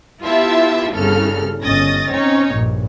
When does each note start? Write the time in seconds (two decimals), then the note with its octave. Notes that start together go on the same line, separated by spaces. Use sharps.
0.23 B3 E4 F4 G4 E5 A5
0.94 G1 C2 G2 C#3 A4 F6
1.62 G1 C#4 D#5 D#6 A6 A#6
2.10 C4 C#4 D#4 C#5
2.52 A#1 G2